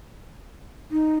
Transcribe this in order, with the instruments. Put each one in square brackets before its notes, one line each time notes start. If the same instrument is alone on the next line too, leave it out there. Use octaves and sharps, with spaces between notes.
[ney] D#4